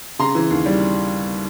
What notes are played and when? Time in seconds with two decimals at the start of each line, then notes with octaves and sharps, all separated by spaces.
0.19 C#3 A#5 C6
0.35 E3
0.51 D#2
0.66 G3